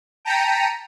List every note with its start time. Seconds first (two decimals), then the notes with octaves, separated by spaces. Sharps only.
0.25 G5 A5 A#5 B6 C#7 D#7